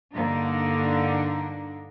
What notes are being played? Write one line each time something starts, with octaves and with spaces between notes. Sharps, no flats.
G2 D3 A#3 D4 D#4